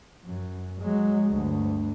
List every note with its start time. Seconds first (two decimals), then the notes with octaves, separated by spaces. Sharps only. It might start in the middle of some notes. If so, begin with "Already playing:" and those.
0.25 F#2
0.81 F#3 G#3
1.29 G1 D2